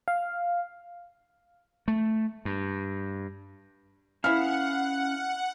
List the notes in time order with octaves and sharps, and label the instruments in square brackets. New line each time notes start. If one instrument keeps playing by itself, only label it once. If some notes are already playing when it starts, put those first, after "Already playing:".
[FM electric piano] F5
[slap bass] A3
G2
[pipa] B3 E4 [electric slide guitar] C#4 F5 G#5 [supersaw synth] F#5 [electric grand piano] F6